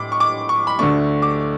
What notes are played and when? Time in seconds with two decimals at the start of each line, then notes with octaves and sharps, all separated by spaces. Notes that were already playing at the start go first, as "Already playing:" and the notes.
Already playing: A2 D6
0.12 C#6
0.20 D6
0.49 C#6
0.67 B5
0.79 D2 D3 A3 D4 C#6
1.22 D6